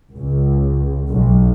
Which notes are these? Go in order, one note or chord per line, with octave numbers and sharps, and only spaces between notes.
C#2
B1